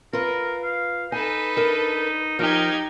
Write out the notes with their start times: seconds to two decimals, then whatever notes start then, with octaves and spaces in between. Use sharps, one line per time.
0.13 F4 A#4 B4
0.63 F5
1.12 D#4 A4 B4 G#5
1.57 D4 A#4
2.39 F3 D#4 G4 A#4 G#6